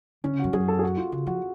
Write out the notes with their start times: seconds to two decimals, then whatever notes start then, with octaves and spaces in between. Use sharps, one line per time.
0.24 D3 C#4
0.33 C#3
0.39 F#2 F#4
0.53 F#2 G#4
0.68 A4
0.79 G#4
0.83 F#4
0.97 F4
1.12 C#3 F#4
1.27 F3 F#4